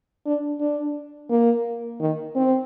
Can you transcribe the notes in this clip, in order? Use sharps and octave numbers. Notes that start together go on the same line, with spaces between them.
D4
D4
A#3
D#3
C4